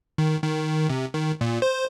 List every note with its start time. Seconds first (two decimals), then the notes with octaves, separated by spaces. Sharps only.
0.18 D#3
0.43 D#3
0.89 C3
1.14 D#3
1.41 A#2
1.62 C5